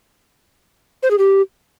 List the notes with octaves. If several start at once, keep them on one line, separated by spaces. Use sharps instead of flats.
C5
G#4
G4